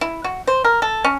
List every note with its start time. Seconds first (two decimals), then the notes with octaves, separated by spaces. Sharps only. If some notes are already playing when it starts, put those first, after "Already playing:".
0.01 E4
0.24 F#4
0.47 C5
0.64 A#4
0.82 A4
1.04 C#4